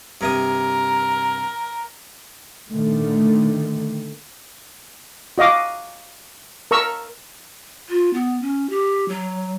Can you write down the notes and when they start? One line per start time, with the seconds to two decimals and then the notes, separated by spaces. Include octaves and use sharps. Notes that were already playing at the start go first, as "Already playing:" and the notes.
0.21 G2 C3 A#4 D#6
2.70 A#2 D3 D#3 A3
5.38 F#4 D#5 F5 D6
6.71 A#4 A#5 C#6 E6
7.89 F4
8.14 B3
8.42 C#4
8.70 G4
9.09 F#3